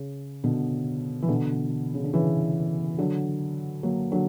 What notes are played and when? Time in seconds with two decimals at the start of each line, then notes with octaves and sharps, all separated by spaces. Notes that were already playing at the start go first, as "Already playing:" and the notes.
Already playing: C#3
0.44 B2 D3
1.22 E3
1.29 B2 D3
1.94 C#3
2.04 D3
2.14 C#3 E3
2.98 D3 F#3
3.83 F#3 A#3
4.12 D3 F#3